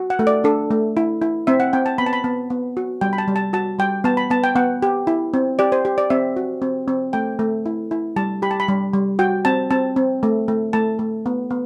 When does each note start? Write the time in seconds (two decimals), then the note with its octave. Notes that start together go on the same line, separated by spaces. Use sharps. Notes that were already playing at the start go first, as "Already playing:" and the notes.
Already playing: F#4
0.10 F#5
0.19 A3
0.27 D5
0.44 D4 A4
0.71 A3
0.97 E4
1.22 E4
1.47 C4 E5
1.60 F#5
1.73 C4 G5
1.86 A5
1.98 B3 B5
2.06 A5
2.13 B5
2.24 B3 A5
2.50 B3
2.77 F#4
3.01 G3 G5
3.13 B5
3.18 A5
3.28 G3
3.36 A5
3.53 F#4 A5
3.79 G3 G5
4.04 B3 A5
4.17 B5
4.30 B3 A5
4.44 G5
4.56 B3 F#5
4.82 G4
5.07 E4
5.34 C4
5.59 G4 D5
5.72 C5
5.85 G4
5.98 D5
6.10 C4 E5
6.36 F#4
6.62 C4
6.88 C4
7.13 A3 G5
7.39 A3
7.66 E4
7.91 E4
8.16 G3 A5
8.42 G4 B5
8.51 A5
8.60 B5
8.68 G3
8.93 G3
9.19 F#4 G5
9.45 C4 A5
9.71 C4 A5
9.96 C4
10.23 A3
10.48 A3
10.73 A3 A5
10.99 A3
11.26 B3
11.51 B3